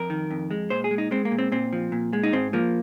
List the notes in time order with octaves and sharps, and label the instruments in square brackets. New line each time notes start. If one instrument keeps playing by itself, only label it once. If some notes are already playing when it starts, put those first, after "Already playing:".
Already playing: [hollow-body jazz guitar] F2 A#4
D#3
F2
G#3
A#2 C5
G#4
G#3
D#4
G#3 C4
A#3
A#2
C4
A#2 C4
F3
A#2
G#3
D#4
G#2 C4
F3 A#3